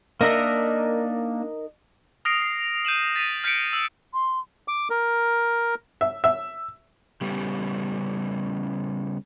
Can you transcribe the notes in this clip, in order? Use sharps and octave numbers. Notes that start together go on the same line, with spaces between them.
A#3 D4 D#4 A#4 D#5 E5
D#6 F6 A#6 C7 D7 F7
C7
G6 D#7 E7 F#7
A6 B6 D#7
F6 G6 B6 C#7 D7
E6
C6
D6
A#4
E5
E5
C#3 G3 B3 C#4